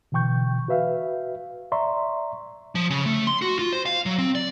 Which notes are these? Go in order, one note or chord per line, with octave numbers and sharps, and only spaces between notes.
B2 D3 E3 G5 C#6 G6
F#4 B4 E5 F5
D5 E5 A#5 C6 C#6
F3
C#3
A3
C6
F#4
F4
C5
F5
F#3
C4
D5